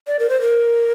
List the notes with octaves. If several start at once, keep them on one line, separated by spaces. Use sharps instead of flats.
D5
A#4
C5
A#4